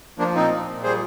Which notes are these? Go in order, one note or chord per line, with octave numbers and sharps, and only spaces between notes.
F3 A#3 D4
A#2 C4 D#4
A#2
A#2
G3 G#4 C5